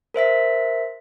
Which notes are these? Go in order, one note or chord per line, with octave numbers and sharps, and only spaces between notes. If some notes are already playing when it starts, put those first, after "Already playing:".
A#4 C5 E5 B6